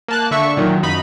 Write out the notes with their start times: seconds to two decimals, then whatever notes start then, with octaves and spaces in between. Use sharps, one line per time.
0.08 A#3 A5 F#6
0.31 D3 E5 C#6
0.57 A#2 D#3 F#3
0.83 F#2 D#4 B5